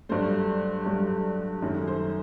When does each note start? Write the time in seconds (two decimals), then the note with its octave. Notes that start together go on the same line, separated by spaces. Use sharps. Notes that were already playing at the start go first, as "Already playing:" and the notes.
0.09 G2 F#3 A3 C5
0.85 G2 F#3 A3
1.62 F#2 D#3 F#3 A3
1.87 C5